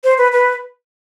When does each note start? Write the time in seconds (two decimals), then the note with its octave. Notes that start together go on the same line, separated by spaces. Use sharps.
0.04 C5
0.18 B4
0.32 B4